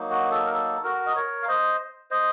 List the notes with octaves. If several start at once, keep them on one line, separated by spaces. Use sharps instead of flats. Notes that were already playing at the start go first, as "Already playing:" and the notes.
Already playing: F#3 A#3 D#4
F#4
A4
A#4
A4
F#4 A#4
D#5
A#4 C#5
F5
C5 D#5
C5 D#5